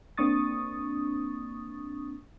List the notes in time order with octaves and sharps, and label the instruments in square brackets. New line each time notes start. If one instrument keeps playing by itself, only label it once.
[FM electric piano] A#3 C4 D4 C#6 D#6 A6